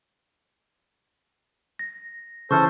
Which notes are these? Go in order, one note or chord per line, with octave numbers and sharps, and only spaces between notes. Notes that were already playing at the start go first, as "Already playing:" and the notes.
A#6
C#3 E3 E4 A4 C5 C#6 F6